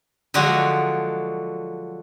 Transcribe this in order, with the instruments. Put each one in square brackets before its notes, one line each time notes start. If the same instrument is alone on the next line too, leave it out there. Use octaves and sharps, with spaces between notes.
[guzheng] D3 F3 F#3 G#3 F#4